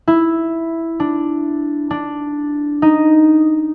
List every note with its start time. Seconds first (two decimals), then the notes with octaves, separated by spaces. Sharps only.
0.08 E4
1.00 D4
1.91 D4
2.82 D#4